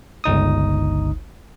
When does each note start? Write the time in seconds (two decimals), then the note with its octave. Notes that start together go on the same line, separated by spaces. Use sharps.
0.24 G1 C#2 D#4 D#6